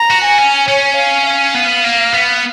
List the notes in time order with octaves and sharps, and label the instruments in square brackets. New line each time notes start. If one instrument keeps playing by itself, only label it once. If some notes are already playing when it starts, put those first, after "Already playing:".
Already playing: [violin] A#5
[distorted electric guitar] F#4
[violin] G#5
[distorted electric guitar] C#4
[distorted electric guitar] C#4 [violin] C#5
[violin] F5
F5
[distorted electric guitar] B3
A#3
B3